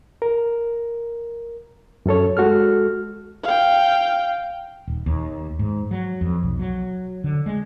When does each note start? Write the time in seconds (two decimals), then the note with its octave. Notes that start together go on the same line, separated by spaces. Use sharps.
0.22 A#4
2.06 F#2 C#4 A4 C#5
2.37 G#3 F#4 A4 F6
3.44 F5 G5
4.88 D#1
5.06 D#2
5.59 G#2
5.91 F#3
6.21 F2
6.43 B1
6.59 F#3
7.24 D3
7.46 G#3